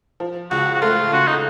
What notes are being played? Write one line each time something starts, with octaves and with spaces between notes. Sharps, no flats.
F3
C#2 F#4
F#4
A3 F4
C#3 F#4
D#4